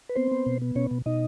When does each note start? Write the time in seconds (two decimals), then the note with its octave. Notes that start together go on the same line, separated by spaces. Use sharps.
0.09 B4
0.16 B3 C4 C5
0.31 B3
0.46 B2
0.62 B3
0.75 B2 C#4 C#5
0.91 B2
1.06 B2 D#4 D#5